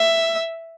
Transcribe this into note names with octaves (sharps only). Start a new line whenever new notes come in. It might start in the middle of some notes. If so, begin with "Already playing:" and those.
Already playing: E5